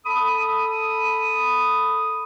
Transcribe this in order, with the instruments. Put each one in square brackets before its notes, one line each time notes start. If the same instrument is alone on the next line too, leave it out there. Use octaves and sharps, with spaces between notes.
[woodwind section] A4 B5 D#6